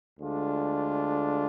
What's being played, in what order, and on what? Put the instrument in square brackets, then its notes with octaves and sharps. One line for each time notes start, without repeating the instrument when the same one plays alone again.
[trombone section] D2 D3 G#3 D4 F4